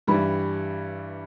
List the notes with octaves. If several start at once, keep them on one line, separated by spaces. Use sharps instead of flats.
G2 E3 G3 B5